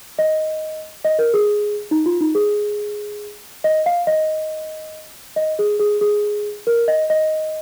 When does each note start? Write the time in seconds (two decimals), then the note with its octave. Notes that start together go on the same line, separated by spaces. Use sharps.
0.19 D#5
1.05 D#5
1.19 A#4
1.34 G#4
1.91 D#4
2.06 F4
2.21 D#4
2.35 G#4
3.64 D#5
3.86 F5
4.07 D#5
5.36 D#5
5.59 G#4
5.79 G#4
6.01 G#4
6.67 A#4
6.88 D#5
7.10 D#5